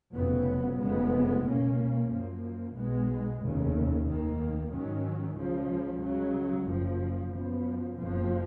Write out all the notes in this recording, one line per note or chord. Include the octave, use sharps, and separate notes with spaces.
F1 F2 C#3 F#3 B3
F1 F2 C#3 G#3 B3
C#2 B2 A#3 C#4
F#2 F3 A#3
B1 B2 G#3 B3
F1 D#2 C#3
F1 D#2 D#3 A#3
G#2 D#3 F#3 C#4
C#2 C#3 F3
C#2 C#3 F#3
F#1 F#2 F3
F#2 F3 B3
F#1 F2 F3